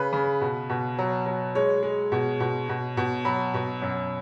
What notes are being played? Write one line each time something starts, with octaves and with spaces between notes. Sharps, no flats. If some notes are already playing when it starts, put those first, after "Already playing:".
Already playing: C#3 B4
C#3
B2
B2
F#3
F#3
G#3 C#5
G#3
B2
B2
B2
B2
F#3 B5
B2
F#2